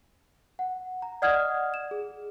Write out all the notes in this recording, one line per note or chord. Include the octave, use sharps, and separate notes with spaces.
F#5
A#5
D5 D#5 F#5 D#6 F6 G#6
E7
G#4